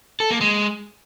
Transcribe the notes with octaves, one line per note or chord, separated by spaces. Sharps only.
A4
A#3
G#3